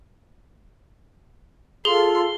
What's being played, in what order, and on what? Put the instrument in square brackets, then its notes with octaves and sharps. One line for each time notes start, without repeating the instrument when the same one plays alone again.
[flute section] F4 A4 [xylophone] G#4 [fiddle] C6 [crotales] G7